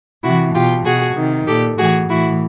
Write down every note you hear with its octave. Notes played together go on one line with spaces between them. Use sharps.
C3 E3 E4 F#4
B2 F4 G4
B2 F#4 G#4
C3 D#3
A#2 G4 A4
A2 E3 F#4 G#4
A2 E3 E4 F#4